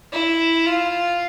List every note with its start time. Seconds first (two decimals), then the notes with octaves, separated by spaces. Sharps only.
0.12 E4
0.66 F4